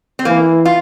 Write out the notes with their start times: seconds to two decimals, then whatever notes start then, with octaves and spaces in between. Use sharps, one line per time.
0.19 C4
0.25 E3 A#3
0.65 F4